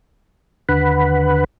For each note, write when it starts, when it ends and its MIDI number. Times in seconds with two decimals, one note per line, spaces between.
0.69 1.44 39
0.69 1.44 50
0.69 1.44 71
0.69 1.44 78
0.69 1.44 83